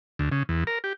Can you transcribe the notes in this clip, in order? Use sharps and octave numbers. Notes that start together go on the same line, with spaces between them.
D2
C#3
E2
A#4
G4